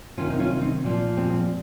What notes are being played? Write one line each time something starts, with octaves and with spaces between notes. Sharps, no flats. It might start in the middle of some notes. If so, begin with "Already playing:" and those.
C3 D#3 C#4 F4
D#4
C#4 F4
C4 D#4
A#2 F3
G#3 C4